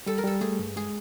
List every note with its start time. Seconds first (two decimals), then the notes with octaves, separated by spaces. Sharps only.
0.06 G3 A4
0.18 A#4
0.24 G3 A4
0.41 A3 G#4
0.59 G2
0.76 G#3 G#4